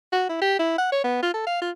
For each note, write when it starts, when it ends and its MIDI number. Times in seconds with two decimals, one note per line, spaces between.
0.13 0.28 66
0.29 0.37 64
0.41 0.56 67
0.59 0.74 64
0.78 0.88 78
0.92 1.01 73
1.04 1.18 59
1.23 1.34 65
1.34 1.45 69
1.47 1.57 77
1.62 1.71 65